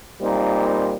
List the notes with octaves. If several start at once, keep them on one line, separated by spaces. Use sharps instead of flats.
A#2 G3 A#3 C4 D#4